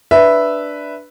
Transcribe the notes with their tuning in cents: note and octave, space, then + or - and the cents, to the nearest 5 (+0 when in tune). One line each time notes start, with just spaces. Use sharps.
D4 +0 B4 +0 E5 +0